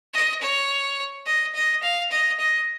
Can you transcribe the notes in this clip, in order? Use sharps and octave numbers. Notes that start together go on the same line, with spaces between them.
D#5
C#5
D#5
D#5
F5
D#5
D#5